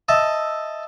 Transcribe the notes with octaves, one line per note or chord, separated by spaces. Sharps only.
D#5 E5 A5